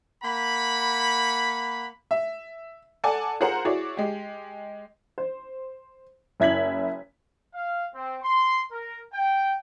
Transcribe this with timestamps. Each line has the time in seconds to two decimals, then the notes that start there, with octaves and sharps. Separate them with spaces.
0.24 A#3 F#5 B5
2.11 E5
3.04 A4 D5 F#5 G#5 A5
3.40 F4 G#4 A#4 C5 F#5 A#5
3.65 E4 F#4 G#4 C#5 D5
3.97 G#3 G4
5.18 C5
6.40 F#1 E4 G#6 B6 F#7
7.55 F5
7.94 C4
8.23 C6
8.72 A#4
9.14 G5